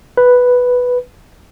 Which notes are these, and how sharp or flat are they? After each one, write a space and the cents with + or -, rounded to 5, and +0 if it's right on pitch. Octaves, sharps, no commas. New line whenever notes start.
B4 +0